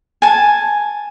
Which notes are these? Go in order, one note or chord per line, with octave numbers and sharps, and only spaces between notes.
G#5 A5